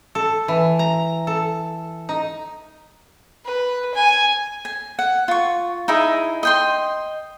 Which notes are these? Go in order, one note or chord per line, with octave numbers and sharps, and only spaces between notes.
A4
E3
A#5
A4
D#4
B4
G#5
G#5
F#5
F4 C#6
D#4 E4 G#4
D#5 G5 C6